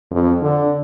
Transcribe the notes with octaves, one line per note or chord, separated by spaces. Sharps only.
F2
D3